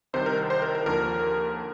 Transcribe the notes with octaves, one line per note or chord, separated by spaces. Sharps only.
C2 C3 D#3 C5
A#4
C5
A#4
A#4
D#2 D3 F3 A#4